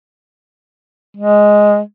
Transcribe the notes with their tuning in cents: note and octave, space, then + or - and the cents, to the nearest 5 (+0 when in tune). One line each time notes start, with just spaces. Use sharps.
G#3 +0